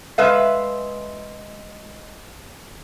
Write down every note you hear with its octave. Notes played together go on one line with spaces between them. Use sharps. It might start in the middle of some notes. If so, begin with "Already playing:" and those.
G#3 B4 E5 F5